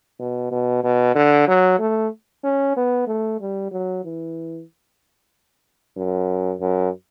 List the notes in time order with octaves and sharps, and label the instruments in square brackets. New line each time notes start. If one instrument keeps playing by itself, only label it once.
[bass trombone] B2
B2
B2
D3
F#3
A3
C#4
B3
A3
G3
F#3
E3
F#2
F#2